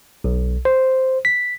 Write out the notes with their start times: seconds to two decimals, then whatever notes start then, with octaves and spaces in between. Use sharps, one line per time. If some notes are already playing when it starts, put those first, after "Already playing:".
0.24 B1
0.65 C5
1.25 B6